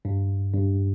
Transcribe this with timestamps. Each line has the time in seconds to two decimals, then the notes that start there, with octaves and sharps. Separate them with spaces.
0.05 G2
0.54 G2